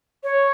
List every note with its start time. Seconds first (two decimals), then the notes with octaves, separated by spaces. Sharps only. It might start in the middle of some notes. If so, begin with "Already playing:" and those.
0.23 C#5